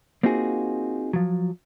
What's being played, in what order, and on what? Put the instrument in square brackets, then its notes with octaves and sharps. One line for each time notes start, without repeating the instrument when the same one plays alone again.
[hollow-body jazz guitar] A#3 C4 D#4 F4 F#4 G#4
F3 F#3